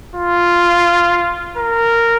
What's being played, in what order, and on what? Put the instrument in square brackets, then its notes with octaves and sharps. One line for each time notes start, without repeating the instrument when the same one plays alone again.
[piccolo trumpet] F4
A#4